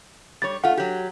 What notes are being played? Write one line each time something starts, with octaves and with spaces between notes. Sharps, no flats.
G3 C#5 A6
A3 F4 F#5
F#3 G4